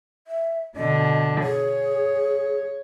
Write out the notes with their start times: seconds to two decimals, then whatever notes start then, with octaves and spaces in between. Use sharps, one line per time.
0.27 E5
0.76 B2 D3 D#5
1.43 G#4 C#5